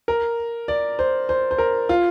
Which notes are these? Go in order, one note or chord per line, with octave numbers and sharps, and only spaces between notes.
A#4
D5
C5
C5
C5
A#4
F4